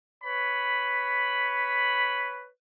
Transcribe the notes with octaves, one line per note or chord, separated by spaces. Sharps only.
B4 C#5 B5